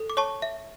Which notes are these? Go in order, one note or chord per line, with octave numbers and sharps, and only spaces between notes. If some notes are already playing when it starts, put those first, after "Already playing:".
Already playing: A4
D6
C#5 A5 C#6
E5